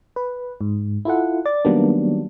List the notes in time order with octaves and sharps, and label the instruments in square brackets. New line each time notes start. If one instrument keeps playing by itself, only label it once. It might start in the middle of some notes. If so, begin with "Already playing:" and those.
[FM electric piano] B4
G#2
E4 F4 A4 F#5
D5 A6
D#3 F#3 G3 A#3 B3 D4